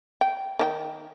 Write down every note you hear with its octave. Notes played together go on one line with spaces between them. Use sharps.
G5
D#3 D4 G5